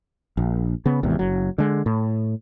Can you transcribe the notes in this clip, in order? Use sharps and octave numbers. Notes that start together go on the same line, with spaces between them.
A#1
C#3 B3
G#1 E2 C3
F#1 F#3
D3 G#3
A2